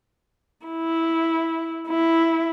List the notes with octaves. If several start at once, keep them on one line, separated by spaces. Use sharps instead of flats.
E4
E4